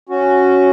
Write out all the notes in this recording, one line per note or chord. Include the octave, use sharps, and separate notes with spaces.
C#4 F#4